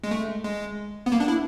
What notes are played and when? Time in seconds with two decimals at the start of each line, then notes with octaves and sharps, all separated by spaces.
0.04 G#3
0.11 A3
0.44 G#3
1.06 B3
1.12 A#3
1.20 D4
1.28 E4